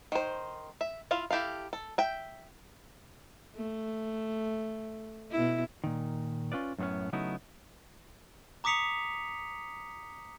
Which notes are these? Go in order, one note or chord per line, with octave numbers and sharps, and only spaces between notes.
D#3 C5
E5
E4 F4 F5
E4 G4 A4 F5
A4
E5 G5
A3
B2 E4
A#2 D#3
C#4 F4 B4 D5
F#2 A2 A3 B3 C#4
C#3 F#3 A3 B3 D#4 E4
A#5 D6 D#6 B6 C#7 F7